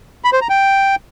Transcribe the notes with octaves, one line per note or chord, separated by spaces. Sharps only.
B5
C5
A#5
G5